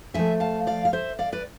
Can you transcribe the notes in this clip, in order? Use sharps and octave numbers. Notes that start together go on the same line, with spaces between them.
E2 C3 F3 A3 E5 G#5
F5 A5
D5 F5
F5
C5 E5
D5 F5
B4 D5